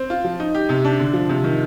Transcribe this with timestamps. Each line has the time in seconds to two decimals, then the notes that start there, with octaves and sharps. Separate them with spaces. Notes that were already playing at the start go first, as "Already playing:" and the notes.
Already playing: C4
0.10 F4
0.24 F3
0.40 D#4
0.55 G4
0.69 C3
0.85 D4
1.00 D3
1.13 F3
1.29 C3
1.44 D#3